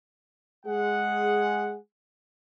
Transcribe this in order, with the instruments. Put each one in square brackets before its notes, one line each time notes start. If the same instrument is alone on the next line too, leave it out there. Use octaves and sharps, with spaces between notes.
[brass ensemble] G#3 G#4 F#5